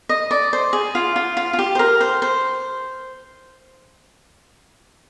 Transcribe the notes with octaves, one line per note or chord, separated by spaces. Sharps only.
D#5
D5
C5
G#4
F4
F4
F4
F4
G4
C5
A#4
C5
C5